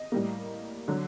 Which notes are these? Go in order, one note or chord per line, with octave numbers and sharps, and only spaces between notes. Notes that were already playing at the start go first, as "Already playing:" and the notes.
Already playing: D#5
A2 G3 A#3
D3 F#3